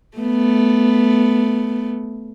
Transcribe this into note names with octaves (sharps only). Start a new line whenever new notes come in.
A3 B3